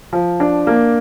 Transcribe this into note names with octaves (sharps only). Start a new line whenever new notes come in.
F3
D4
A#3